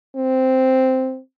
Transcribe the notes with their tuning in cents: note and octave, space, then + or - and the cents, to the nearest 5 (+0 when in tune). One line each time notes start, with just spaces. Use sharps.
C4 -5